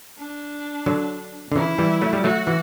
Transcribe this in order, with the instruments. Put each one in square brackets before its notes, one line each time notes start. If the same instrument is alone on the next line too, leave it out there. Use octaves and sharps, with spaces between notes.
[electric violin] D4
[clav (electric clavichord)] D3 F#3
D3
[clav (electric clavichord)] C#3 E3 [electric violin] E4
[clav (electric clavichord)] E3 G3
F#3 A3
G3
[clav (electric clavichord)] F#3 A3 [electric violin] F#4
[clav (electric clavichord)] E3